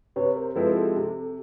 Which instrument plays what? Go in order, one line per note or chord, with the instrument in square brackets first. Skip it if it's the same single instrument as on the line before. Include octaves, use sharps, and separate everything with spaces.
[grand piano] C3 [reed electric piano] B4 C#5
[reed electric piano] A#4 C5
[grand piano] F3 G#3 C4 E4 [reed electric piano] A4 B4
[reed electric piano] G4 A4
[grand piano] C3